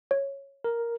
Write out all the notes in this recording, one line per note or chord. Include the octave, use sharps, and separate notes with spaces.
C#5
A#4